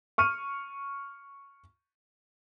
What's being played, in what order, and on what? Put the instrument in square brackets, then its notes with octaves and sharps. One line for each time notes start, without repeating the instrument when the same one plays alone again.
[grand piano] C#6 F6 D#7